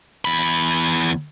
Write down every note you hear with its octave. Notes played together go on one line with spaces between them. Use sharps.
E2 B5